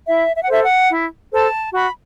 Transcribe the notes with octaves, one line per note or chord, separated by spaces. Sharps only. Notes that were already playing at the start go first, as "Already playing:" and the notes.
E4 E5
E5
F#5
A4 C5 E5
F#5
E4
A4 C5 A5
F#4 B5